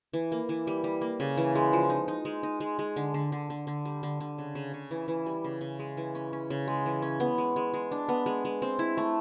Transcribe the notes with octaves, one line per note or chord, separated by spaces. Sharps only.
E3
A#3
E3
G3
G3
A#3
C#3
E3
G#3
F3
D#4
D#4
G#3
D#4
G#3
G#3
D3
D3
D3
D3
D3
G3
D3
D3
C#3
C#3
C#3
E3
E3
G3
C#3
C#3
G#3
E3
C#4
C#4
C#3
G#3
E3
C#4
B3
G#3
G#3
G#3
D4
B3
G#3
G#3
C4
E4
A3